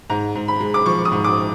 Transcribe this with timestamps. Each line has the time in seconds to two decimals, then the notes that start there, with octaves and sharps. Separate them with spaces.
0.10 G#2 A#5
0.35 G#2
0.48 B5
0.60 G#3
0.74 D6
0.86 F3 C#6
1.05 D#6
1.12 G#2
1.24 D6